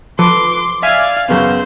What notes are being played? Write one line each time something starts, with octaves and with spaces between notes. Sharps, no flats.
F3 A4 B4 C6 D6
D5 E5 F5 G#5 G#6
F#2 C#3 B3 C5